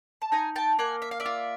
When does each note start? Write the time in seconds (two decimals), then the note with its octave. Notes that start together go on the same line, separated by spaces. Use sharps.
0.22 A5
0.32 D#4 G#5 A#5
0.56 G5 A5
0.79 A#3 F#5 G#5
1.02 E5
1.11 F5
1.20 D5 E5
1.26 F4